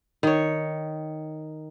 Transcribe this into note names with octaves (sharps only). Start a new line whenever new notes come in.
D#3 C#5